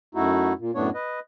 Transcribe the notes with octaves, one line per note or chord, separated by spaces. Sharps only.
F#2 A3 D#4 E4 F#4
A#2
F#2 A2 A3 B3 D4 C#5
B4 D#5